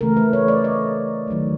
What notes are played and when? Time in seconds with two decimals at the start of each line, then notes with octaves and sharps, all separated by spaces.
0.01 C#3 E3 A3 A#4
0.17 B4
0.33 C#5
0.48 D5
0.64 D#5
1.27 D#3 F#3 A3